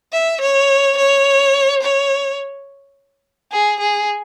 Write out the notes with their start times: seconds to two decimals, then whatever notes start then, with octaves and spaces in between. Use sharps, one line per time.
0.13 E5
0.42 C#5
0.98 C#5
1.83 C#5
3.52 G#4
3.80 G#4